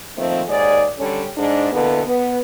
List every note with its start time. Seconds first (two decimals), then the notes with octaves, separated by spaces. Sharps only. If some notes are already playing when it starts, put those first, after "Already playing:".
0.17 D#3 F3 A3 A#3 C4
0.48 D#2 G#2 G#4 D5
0.99 D3 G3 C#4
1.37 G#2 D4
1.72 B2 D3 E3 A#3 B3
2.06 B3